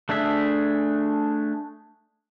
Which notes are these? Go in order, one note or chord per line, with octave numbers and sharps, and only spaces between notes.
A3 D4 G#4 E5